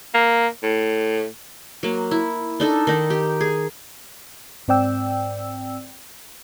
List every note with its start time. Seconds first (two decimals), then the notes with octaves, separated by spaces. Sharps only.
0.14 A#3
0.63 A2
1.83 F#3 A#3
2.11 E4
2.60 D4 D#4 A4
2.87 D#3 D#4
3.10 G4
3.41 G#4
4.68 G#2 C4 D5 G5 E6